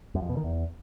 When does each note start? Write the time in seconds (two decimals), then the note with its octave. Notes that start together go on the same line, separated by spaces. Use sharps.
0.15 F#2
0.22 F2
0.29 B2
0.37 D#3
0.44 E2